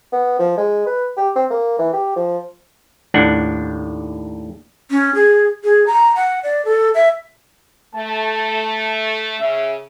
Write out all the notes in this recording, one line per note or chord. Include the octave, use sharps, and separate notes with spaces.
B3
F3
G#3
B4
G4
C4
A#3
E3
G4
F3
D#2 A2 D4 F#5
C#4
G#4
G#4
A#5
F#5
D5
A4
E5
A3 A5
C#3 E5